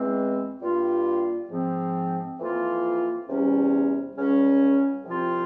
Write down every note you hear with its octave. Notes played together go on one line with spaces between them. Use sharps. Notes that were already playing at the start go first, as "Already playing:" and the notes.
Already playing: E2 E3 G#3 C4
G2 G3 A#3 F4
G#2 F3 C4
F2 E3 A#3 F4
E2 C3 G3 C#4
C#2 C#3 G3 C#4
C2 C3 F3 C4 F4